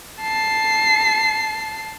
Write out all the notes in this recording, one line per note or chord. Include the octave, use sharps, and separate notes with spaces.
A5 C7